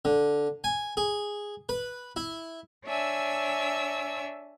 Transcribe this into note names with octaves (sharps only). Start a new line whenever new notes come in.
D3
G#5
G#4
B4
E4
D4 C#5 E5 G#5 E6